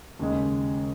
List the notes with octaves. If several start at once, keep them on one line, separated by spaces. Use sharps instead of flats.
D#2 C#3 G#3